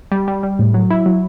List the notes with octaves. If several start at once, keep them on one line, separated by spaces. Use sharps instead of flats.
G3
G3
G3
A2
F#3
E4
F#3